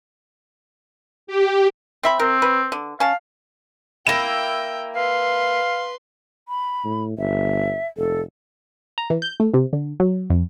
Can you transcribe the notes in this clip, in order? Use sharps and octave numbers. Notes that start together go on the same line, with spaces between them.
G4
C4 E5 B5
C4 A#4
B4
D3
C#4 F5 A5
A#3 E4 G5 A#6 E7
B4 F5 C6
B5
A2
G1 E5
F1 A4
A#5
E3
G6
A3
C3
D3
F#3
F2